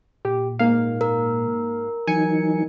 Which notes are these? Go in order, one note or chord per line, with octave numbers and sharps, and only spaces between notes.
A#2 G4
G#2 A#3 F5
A#4
E3 F#3 D#4 G#5 C#7